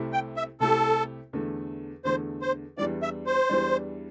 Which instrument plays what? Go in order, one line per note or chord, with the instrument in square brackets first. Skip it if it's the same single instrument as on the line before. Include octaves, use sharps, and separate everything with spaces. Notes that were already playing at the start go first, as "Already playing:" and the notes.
Already playing: [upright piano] C2 C3 A3 E4 G4
[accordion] G5
E5
[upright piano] C2 C3 A3 E4 G4 [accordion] A4
[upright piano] E2 D3 A3
[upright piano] E2 D3 A3 [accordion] C5
[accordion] C5
[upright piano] E2 E3 G3 D4 [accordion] D5
[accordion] E5
C5
[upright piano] E2 E3 G3 D4